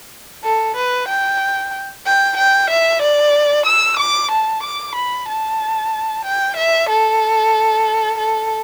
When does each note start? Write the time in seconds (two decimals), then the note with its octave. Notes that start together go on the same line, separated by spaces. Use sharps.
0.44 A4
0.76 B4
1.08 G5
2.06 G5
2.37 G5
2.70 E5
3.02 D5
3.66 E6
3.99 D6
4.31 A5
4.63 D6
4.96 B5
5.28 A5
6.25 G5
6.57 E5
6.89 A4
8.18 A4